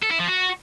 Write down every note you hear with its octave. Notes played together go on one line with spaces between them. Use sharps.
A4
E4
F3
F#4